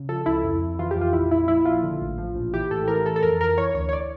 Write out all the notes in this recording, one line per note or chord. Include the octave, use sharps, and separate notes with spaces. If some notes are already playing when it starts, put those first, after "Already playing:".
Already playing: C#3
F3 A4
C#2 E4
F2
F2
E3 F4
F2 G4
F4
A#1 E4
A#1 E4
F3 E4
A#1 F4
D3
A1
F3
A#1
E3 G4
A2 A4
E3 A#4
E3 A4
A4
F2 A#4
F2 A#4
E3 C#5
D2 C#5
C#5
D5